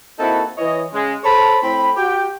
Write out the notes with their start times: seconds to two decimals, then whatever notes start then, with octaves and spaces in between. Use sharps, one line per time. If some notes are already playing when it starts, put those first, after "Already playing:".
0.19 A#3 C4 D#4 E4 F#4 A4
0.58 E3 C#5 D#5
0.93 C#3 G#3
1.24 A4 C5 C#5 A5 B5
1.62 A2 C4 B5
1.96 F#4 G4 G5